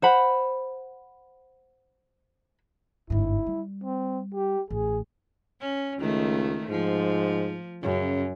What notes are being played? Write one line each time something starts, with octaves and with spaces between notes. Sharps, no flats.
C5 F#5 B5
G1 G#2 E4
G3
C4
G4
A1 G#4
C#4
C#2 D#3 A3
G#2 F3
F#2 C#3